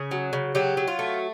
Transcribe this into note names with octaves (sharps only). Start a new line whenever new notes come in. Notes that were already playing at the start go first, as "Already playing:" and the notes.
Already playing: C#3 G#4
F#3
C#3
F#3 G4
F#3
F4
A3